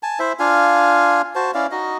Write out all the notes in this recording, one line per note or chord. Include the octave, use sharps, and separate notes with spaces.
G#5 A5
E4 C5 E5
D4 F4 F5 G#5
F#4 C5 A5
C#4 E4 D5 F5
D#4 F#4 D#5